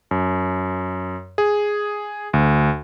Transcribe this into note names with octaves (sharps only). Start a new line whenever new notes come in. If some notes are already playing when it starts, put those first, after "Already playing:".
F#2
G#4
D2